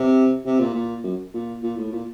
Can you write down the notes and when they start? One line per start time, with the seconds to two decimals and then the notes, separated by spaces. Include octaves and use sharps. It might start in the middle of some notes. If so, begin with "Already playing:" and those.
Already playing: C3
0.46 C3
0.59 A#2
0.74 A#2
1.04 F#2
1.34 A#2
1.63 A#2
1.77 A2
1.93 A#2